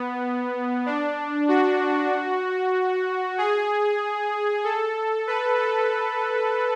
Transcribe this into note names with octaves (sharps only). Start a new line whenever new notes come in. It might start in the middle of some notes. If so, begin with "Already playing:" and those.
Already playing: B3
D4
F#4
G#4
A4
B4
A4